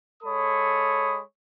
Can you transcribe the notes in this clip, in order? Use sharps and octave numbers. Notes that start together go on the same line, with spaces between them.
G#3 A4 C#5 B5 D#6